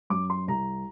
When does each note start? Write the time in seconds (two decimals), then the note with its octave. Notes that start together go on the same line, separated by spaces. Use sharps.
0.10 F#2 D6
0.30 C6
0.48 C2 A#5